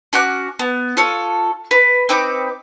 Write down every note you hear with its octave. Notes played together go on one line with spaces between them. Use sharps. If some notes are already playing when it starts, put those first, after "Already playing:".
C#4 F#4 D6 F#6
B3
F4 A4 C#5
B4
C4 D#4 B4 D6